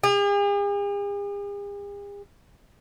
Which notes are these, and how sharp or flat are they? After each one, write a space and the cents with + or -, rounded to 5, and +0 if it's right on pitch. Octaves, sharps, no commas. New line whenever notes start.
G#4 -45